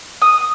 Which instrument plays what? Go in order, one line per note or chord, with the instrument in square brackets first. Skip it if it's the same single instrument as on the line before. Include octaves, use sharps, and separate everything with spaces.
[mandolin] D#6